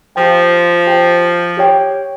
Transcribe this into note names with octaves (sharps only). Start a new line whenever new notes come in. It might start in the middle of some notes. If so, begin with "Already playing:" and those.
F3 G4 C5 G5
G4 C5 G5
G4 C#5 G5